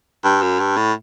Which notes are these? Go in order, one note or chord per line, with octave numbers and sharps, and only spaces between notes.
G2
F#2
G2
A2